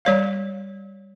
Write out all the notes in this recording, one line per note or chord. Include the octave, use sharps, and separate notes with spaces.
G3 C#5 F5